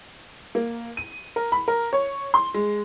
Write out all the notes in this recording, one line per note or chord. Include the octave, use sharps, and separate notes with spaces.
A#3
D#7
A#4
B5
A#4
C#5
C6
G#3